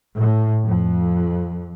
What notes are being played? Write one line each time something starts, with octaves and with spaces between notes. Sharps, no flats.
A2
F2